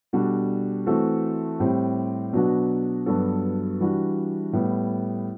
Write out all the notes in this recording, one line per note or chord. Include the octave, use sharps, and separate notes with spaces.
B2 G3 D4 F#4 A4
E3 A3 C4 F#4 A4
A2 G3 C4 G4
B2 F#3 B3 D4 F#4
G2 F#3 B3 F#4 A4
E3 G3 D4 F#4
A2 G3 B3